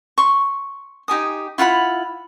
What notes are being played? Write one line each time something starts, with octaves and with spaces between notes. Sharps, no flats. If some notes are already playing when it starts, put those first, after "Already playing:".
C6 C#6
D#4 G4 G#5 D#6
E4 F4 F#5 B5